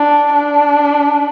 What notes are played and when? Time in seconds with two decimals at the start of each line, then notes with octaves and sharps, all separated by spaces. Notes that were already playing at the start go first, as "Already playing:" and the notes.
Already playing: D4
0.33 D4